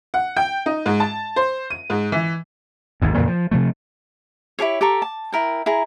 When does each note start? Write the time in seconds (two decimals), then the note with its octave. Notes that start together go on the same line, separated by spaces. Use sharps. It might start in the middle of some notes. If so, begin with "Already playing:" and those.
0.14 F#5
0.37 G5
0.66 D#4
0.86 G#2
1.00 A5
1.36 C5
1.70 D#7
1.90 G#2
2.12 E3
3.02 G#1 D#2 G#2
3.15 F2 A#2 C#3 E3
3.27 F3
3.51 C3 F3 A3
4.59 E4 G4 G#4 C#5
4.81 G4 A4 A#5 C#6
5.02 A5
5.32 E4 A#4 G5
5.66 E4 G#4 A#5